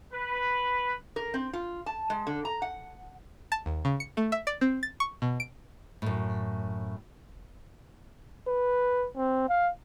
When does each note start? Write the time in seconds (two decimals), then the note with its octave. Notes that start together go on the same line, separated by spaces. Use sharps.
0.13 B4
1.16 A#4
1.34 C4
1.53 F4
1.86 A5
2.10 G#3
2.27 D3
2.45 A#5
2.62 F#5
3.52 A5
3.66 D#2
3.85 C#3
4.00 C#7
4.17 A3
4.32 E5
4.47 D5
4.61 C4
4.83 A6
5.00 C#6
5.22 B2
5.40 D7
6.02 F#2 A2
8.48 B4
9.17 C4
9.49 F5